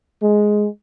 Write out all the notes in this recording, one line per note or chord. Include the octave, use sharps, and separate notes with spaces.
G#3